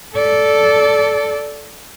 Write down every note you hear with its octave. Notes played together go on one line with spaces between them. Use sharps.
A4 D5